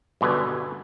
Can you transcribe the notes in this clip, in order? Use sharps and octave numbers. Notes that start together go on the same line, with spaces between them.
G2 B2 D3 B4 G#5